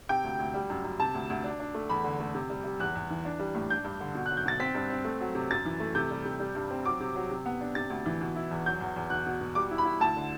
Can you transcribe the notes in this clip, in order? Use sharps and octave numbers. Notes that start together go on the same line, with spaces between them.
C3 G5
D2
D2
G3
F#2
F#2
C3 A5
D2
D2
D4
D4
A3
E2 B5
D3
A3
C3
G3
G3
E2 F#6
E2
E3
D4
G3
A2
D4 G6
G2
D3
B2
F#3 F#6
G6
B2 A6
C4 B6
G2
C4
A3
F#3
C3
F#2 A6
E3
A3
C3 G6
G3
C3
G3
G2
C4
F#3 D6
C3
F#3
C3
B3
D4
C3 A6
D2
E3
B2
E4
E2
F#3 G6
E2
E2
B2 F#6
B2
B2
G3 D6
E4
B5
E4
D2 A5
D3